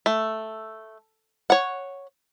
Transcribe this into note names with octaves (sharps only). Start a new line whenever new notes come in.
A3
C#5 F#5